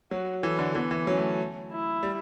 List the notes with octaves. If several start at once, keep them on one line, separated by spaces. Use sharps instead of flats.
F#3 F#4
E3 A4
D3
E3 B3
E3
F#3 C#4
A3
E4
G3